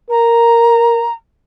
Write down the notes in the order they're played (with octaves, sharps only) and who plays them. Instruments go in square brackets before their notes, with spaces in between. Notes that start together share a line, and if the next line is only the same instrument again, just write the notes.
[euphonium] A#4 [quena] A#5